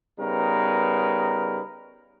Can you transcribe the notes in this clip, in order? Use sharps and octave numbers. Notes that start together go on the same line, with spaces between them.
C#3 G3 B3 D#4 A#4 B4